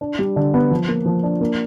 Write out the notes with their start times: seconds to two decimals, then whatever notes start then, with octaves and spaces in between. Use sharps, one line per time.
0.01 D4
0.19 G3
0.36 D3
0.54 B3
0.71 F3
0.88 A#3
1.06 F3
1.23 D4
1.41 A#3